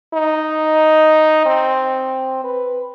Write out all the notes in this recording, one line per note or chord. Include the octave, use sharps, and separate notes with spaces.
D#4
C4
B4